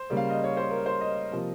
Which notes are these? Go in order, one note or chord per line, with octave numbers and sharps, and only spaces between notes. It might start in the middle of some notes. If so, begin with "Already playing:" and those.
Already playing: C5
C#3 G3 A#3
F5
D#5
C#5
C5
A#4
C5
D#5
C3 F3 A#3